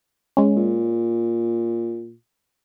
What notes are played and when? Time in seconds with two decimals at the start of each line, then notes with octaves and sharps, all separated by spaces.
0.37 G#3 C#4
0.57 A#2